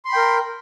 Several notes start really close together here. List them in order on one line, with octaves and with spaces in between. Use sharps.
C6 B5 G5 A#4